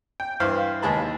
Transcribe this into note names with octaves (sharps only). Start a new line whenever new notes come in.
G5
G2 E3 C5 F5 F6
D#2 G#3 G#4 A5 B5